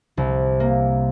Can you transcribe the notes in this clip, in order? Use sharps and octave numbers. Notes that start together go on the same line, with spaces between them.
C2
A#3